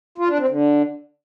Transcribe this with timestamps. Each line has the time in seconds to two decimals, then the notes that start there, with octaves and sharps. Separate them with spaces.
0.18 F4
0.28 D4
0.39 C4
0.49 D3